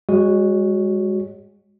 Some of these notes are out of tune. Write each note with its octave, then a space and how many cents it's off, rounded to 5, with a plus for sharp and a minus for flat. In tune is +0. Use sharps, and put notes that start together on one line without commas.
G#3 -25 F#4 +0 C#5 +0